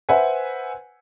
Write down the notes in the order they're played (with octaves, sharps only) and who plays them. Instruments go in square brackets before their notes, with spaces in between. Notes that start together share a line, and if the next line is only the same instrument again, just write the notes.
[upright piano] B4 C5 E5 F#5 G#5